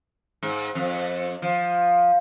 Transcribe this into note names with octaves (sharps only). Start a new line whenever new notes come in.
G#2
F2
F3